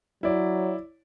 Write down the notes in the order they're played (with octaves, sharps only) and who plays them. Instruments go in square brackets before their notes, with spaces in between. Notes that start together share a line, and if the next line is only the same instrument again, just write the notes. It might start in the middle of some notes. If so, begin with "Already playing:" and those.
[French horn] F#3 [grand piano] E4 C#5 D5